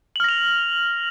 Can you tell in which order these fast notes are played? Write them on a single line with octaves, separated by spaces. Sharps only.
F#7 F6 A#6 F7